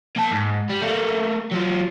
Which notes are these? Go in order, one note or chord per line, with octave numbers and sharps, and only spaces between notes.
A#3 A5
G#2
G3
A3 A#3
F#3 F4